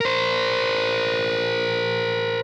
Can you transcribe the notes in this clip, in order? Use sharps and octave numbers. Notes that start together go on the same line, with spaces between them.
A#4 C5